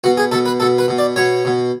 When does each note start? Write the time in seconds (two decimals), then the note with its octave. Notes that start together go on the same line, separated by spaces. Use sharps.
0.04 B2 F#4
0.17 G#4
0.32 B2 A4
0.45 B4
0.60 B2 A4
0.78 B4
0.88 B2
0.98 D5
1.16 B2 C#5
1.45 B2